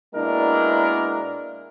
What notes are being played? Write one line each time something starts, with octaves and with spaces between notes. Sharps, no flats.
B2 G#3 A#3 D4 E4 A#4